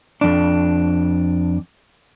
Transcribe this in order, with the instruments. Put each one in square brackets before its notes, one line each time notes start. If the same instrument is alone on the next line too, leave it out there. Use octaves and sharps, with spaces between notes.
[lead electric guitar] F2 D4